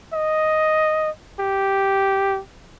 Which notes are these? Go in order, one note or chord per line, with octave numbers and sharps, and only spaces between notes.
D#5
G4